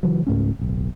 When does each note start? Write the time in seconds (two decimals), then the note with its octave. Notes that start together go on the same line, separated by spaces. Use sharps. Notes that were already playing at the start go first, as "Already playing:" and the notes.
0.03 C#3 E3 F#3
0.27 C#2 G#2 A3 C#4
0.59 D1 B1